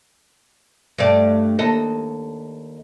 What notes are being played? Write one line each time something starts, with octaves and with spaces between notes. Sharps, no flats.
G2 A3 D5
D#2 A4 D#5